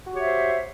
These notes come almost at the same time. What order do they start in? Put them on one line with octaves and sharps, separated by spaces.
F#4 G4 C#5 E5 C5